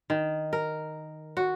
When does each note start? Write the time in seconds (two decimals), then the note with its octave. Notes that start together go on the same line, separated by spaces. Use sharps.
0.10 D#3
0.53 A#4
1.37 F#4